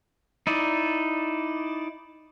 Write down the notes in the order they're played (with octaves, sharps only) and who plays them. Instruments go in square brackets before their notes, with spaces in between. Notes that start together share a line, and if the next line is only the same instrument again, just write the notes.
[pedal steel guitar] D#4 E4 D5